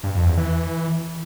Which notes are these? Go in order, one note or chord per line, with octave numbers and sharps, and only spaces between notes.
G2
F2
E2
E3